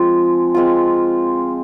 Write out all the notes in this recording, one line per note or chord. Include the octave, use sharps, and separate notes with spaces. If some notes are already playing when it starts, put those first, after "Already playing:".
Already playing: F3 G#3 C4
G#3 C4 F4